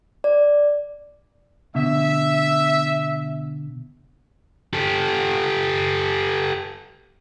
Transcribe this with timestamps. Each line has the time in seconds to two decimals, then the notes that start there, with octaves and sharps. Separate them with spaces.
0.24 D5
1.75 B2 D3 E5
4.74 G4 A4